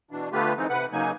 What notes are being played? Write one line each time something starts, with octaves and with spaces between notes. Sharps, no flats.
B2 E3 D4
D3 A3 B3 F4 G4 B4
E3 G#3 C4 D#4
C3 B4 F#5
C#3 F#3 A#3 D#4 G#5